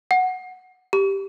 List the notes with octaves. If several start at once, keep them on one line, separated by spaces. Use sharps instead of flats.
F#5
G4